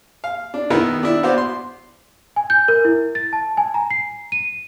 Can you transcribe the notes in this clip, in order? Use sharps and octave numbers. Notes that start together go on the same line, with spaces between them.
F5
D4
D#3 B3 D#4 E4 A#4 B4
D4 E4
B3 F#4 C5 D5
C6
G#5
G6
A#4
E4
A6
A5
G#5
A#5
C7
D#7